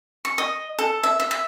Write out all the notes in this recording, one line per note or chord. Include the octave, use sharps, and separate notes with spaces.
C#6
D#5
A4
E5
E5
E5